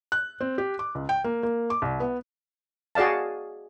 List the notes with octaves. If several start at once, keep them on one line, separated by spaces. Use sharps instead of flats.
F#6
C4
G4
D6
C#2
G5
A#3
A#3
D6
C2
B3
F#4 G#4 D5 F5 A5